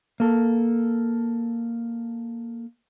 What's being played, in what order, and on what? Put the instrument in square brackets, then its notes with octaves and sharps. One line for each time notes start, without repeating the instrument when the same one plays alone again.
[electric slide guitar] A#3 A4